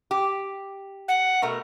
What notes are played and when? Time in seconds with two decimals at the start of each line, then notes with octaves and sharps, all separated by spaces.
0.11 G4
1.08 F#5
1.42 B2 A3 A#4